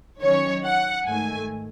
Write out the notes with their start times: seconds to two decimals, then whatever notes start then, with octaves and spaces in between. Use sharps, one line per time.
0.21 D#3 F#3 C#4 C#5
0.64 F#5
1.07 G#2 D#3 A3 G#5